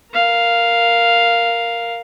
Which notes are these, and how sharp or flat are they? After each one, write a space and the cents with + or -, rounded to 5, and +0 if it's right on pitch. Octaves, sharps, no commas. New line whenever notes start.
A#4 +0 F5 +0